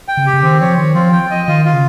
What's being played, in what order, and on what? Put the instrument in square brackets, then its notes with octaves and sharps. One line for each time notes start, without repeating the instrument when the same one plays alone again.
[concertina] G5
[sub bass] C#3
[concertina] G4
[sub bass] C#3
[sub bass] D#3 [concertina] C4
[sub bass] F3 [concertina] C#5
[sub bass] D#3 [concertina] C4
[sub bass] F3 [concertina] F4
[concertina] G5
D#5
[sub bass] D#3 [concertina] F4
[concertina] F4
[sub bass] C#3